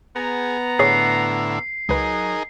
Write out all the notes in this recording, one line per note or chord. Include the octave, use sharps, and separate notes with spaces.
B3 G#4 A#5
A2 D3 E4 G#4 C#5 C#6 C7
C#2 F#3 D#4 G#4 A#4 B4